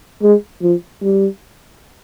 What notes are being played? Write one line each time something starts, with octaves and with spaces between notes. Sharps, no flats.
G#3
F3
G3